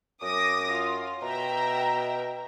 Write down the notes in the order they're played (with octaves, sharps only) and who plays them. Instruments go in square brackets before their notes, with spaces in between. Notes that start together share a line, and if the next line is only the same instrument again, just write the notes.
[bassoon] F#2 [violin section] D6 D#6 A#6
[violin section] F4
[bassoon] B2 [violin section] E5 G5 A#5